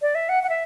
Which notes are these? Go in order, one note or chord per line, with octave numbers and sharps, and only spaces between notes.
D5
E5
F#5
F#5
E5